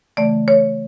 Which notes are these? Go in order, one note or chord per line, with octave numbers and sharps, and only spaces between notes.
C#3 E3 A3 D5
C#5